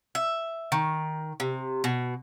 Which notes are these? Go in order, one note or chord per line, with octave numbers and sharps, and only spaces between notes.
E5
D#3
C3
B2